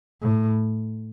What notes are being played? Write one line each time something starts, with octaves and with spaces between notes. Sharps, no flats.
A2